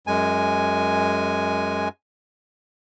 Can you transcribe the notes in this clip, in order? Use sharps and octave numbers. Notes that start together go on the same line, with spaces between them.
F#2 G#3 G#5